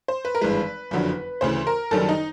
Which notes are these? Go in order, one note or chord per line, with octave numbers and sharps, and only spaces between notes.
C5
B4
A#4
G#1 G2 E3 G#3 B4
F#1 F2 D3 F#3
D2 C#3 E3 C5
A#4
F#1 F#2 D#3 G3 A4
D#4